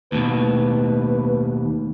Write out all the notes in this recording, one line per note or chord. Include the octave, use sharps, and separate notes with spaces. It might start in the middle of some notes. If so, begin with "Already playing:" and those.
D#2 B2 A3 B4